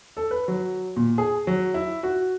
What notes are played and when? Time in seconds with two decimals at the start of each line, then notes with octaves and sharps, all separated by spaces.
0.17 A4
0.31 B4
0.48 F#3
0.96 A#2
1.18 G#4
1.47 F#3
1.74 E4
2.03 F#4